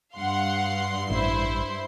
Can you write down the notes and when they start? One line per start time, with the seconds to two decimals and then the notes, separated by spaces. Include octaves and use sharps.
0.16 G2 F5 F#5 C6
1.10 A1 E4 C5